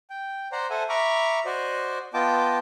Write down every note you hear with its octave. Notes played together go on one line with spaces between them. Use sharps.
G5
C5 D5 F#5 A#5 C6
A4 C5 E5 F#5 G#5
E5 A#5 B5 C#6 D6 F6
F#4 C5 D5 D#5
B3 F4 D#5 G5 A5 D6